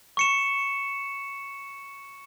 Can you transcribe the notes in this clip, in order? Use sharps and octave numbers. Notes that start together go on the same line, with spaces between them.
C#6 C#7 E7